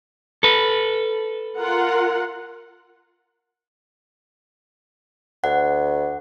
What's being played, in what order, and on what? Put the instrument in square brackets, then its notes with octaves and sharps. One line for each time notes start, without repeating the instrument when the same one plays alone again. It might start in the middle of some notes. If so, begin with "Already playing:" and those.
[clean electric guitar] A4 B4
[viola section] F4 A#4 F#5
[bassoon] D2 [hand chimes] F#5